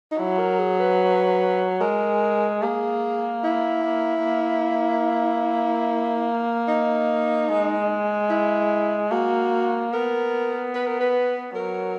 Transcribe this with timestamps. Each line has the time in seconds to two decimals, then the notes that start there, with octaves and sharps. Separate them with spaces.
0.11 D#4
0.19 F#3 E4
0.39 A#4
0.59 G#4
0.80 B4
1.81 G#3 A#4
2.63 A#3 G#4
3.44 E4
4.24 A#3
6.68 D#4
7.49 G#3
8.30 E4
9.11 A#3 F#4
9.93 B3 A#4
10.75 B4
10.87 A#4
11.00 B4
11.55 F#3 A#4